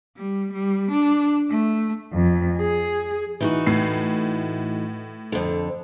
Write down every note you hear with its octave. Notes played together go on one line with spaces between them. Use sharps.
G3
G3
D4
A3
F2
G#4
E3 D#4 F#4
A2 C7
F2 D3